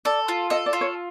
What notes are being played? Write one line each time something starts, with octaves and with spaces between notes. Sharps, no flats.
A4 D5
F4
A4 D#5
D5
F4
C#5